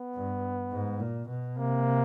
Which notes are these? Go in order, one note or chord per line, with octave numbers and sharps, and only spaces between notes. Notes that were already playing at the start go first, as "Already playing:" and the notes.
Already playing: B3
G2
G#2
A#2
B2
C3 A#3